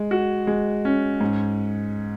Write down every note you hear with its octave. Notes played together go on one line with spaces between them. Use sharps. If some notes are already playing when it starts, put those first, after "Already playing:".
Already playing: G#3
F#4
G#3
C#4
G#2